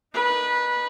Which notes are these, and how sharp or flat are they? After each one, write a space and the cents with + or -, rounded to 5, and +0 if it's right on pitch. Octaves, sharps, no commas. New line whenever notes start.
D#4 -30 B4 -20